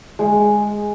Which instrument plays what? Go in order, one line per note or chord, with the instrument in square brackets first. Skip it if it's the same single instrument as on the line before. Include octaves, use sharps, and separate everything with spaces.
[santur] G#3